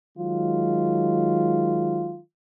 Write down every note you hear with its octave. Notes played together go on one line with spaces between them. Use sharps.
D#3 F#3 G#3 F4